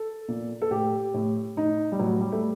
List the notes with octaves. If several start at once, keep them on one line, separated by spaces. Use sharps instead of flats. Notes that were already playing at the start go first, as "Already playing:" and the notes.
Already playing: A4
A#2
A4
A2 G4
A2
A2 D#4
G3
A2 F#3
G3
A3